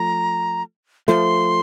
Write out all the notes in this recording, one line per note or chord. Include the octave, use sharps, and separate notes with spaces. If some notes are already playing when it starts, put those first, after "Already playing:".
Already playing: F3 A3 A#5
F3 A3 C6